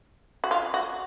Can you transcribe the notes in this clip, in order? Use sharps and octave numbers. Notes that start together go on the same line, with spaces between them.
F#4
F4
F#4